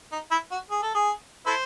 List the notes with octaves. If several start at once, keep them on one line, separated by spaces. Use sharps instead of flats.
D#4
E4
F#4
G#4
A4
G#4
E4 A4 C5